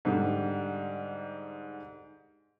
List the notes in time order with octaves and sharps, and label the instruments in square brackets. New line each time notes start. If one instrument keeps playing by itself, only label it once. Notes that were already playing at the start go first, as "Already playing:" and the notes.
[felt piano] G#2 D3 G3